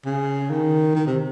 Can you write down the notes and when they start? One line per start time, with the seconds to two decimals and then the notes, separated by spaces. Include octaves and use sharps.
0.06 C#3
0.50 D#3
0.95 D#3
1.07 C3